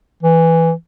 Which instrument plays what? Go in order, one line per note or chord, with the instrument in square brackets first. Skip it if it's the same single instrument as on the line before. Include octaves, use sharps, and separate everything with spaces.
[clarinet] E3